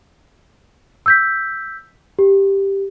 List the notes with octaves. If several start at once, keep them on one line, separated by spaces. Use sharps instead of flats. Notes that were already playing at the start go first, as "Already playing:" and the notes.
E6 G6 B6
G4